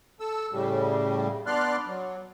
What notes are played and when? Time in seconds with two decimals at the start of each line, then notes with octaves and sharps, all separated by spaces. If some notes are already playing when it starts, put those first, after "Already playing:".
0.20 A4 E6
0.52 A2 C#3 G3
1.46 B3 D4 D5 C6 F6 F#6
1.86 F#3